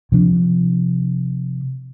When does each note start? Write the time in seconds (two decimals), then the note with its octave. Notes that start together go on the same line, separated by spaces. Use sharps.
0.12 C3 F3 D4